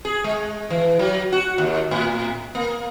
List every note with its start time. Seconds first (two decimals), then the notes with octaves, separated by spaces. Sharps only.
0.05 G#4
0.24 G#3
0.70 E3
0.99 F#3
1.32 F#4
1.58 D#2
1.91 A2
2.55 A#3